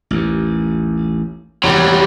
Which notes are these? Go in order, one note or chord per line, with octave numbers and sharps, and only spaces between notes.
A1 D#2
E2 G#2 C3 F#3 G3